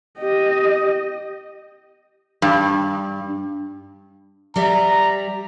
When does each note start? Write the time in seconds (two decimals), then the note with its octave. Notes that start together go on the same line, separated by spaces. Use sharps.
0.18 G4 D#5
2.42 G2
4.56 G3 D5 E5 A#5